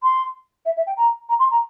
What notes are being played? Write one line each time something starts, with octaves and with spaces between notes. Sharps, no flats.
C6
E5
E5
G5
A#5
A#5
C6
A#5